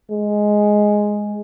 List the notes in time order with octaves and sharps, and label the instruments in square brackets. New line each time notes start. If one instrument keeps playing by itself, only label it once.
[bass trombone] G#3